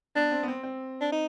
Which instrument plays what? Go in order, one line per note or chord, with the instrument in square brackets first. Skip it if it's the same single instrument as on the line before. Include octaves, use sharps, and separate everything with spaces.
[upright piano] B3 [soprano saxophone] D4
[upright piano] C4
B3
C4
C4
[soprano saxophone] D4
D#4